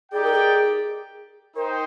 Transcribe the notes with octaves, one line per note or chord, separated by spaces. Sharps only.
D#4 G4 G#4 D5 G5
A#4
G#4
D#4 A#4 C5 G5